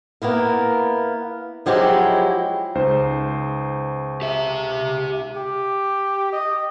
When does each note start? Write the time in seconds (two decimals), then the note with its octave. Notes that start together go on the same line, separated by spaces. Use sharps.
0.22 A#3 B3 E4 A#4
1.66 F3 F#3 G#3 E4 G4
2.75 C#2 D#4 C5
4.22 G4 E5
5.37 G4
6.33 D#5